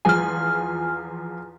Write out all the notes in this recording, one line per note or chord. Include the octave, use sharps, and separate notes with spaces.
E2 F3 G#4 G#5 F6